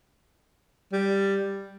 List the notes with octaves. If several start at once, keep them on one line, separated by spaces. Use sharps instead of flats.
G3